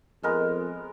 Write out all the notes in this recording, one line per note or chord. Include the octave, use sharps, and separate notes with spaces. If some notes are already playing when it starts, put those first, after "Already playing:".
F2 G#3 B3 A#4